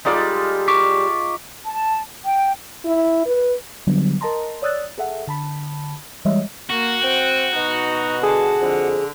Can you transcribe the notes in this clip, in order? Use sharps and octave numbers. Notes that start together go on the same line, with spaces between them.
G3 G#3 D#4 F4 A4 D5
C#6 D6 B6
A5
G5
E4
B4
D3 F#3 G3 B3
A#4 D#5 A5 A#5 C6
C#5 D5 D#6 E6 F#6 A6
G#4 A4 E5 F#5
D3 A5 B5
E3 G3 G#3 C#5 D#5 E5
A#3 F#4
C4 G5
B2 D#4
D3 G#4 A5
F2 D3